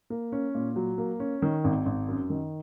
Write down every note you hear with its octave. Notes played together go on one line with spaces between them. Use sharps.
A#3
C#4
A#2
F#3
A#3
C#4
D#3
G#1
G#1
F#2
D#3